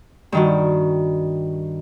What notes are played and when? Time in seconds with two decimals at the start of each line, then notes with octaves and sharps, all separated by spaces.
0.32 G2 D#3 F#4